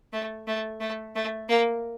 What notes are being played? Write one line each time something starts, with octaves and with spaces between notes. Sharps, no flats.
A3
A3
A3
A3
A#3